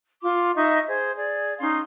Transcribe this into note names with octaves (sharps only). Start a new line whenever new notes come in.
F4 C6 D6
D#4 D#5 E5 C#6
G#4 C5
G#4 D5
C#4 D#4 F5 C6